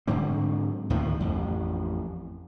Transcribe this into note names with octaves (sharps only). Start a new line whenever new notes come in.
G#2 D3 F#3 C4
D2 A2 D#3 F3
A1 F2